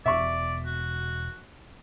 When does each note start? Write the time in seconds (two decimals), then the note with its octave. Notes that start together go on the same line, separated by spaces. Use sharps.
0.06 E1 B2 D5 E5 C#6
0.66 F#4